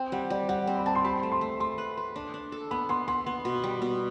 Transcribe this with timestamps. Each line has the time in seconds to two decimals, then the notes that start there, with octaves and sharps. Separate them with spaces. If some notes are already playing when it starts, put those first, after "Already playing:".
Already playing: C4 G5
0.12 G3 F#5
0.30 G3 D5
0.49 G3 F#5
0.67 C4
0.75 B5
0.86 C4 A5
0.95 C6
1.04 G4 B5
1.23 A3
1.32 C6
1.41 A3
1.60 A3 C6
1.78 B4
1.97 B4
2.16 D4
2.34 D4
2.52 A4
2.71 B3 B5
2.89 B3 C6
3.08 B3 C6
3.26 B3
3.45 B2
3.64 G3
3.82 B2